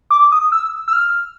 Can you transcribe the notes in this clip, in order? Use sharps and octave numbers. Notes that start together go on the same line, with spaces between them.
D6
D#6
E6
E6
F6